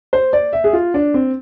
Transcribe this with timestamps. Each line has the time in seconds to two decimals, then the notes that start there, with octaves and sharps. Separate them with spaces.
0.13 C5
0.33 D5
0.53 E5
0.64 G#4
0.73 F4
0.94 D4
1.14 C4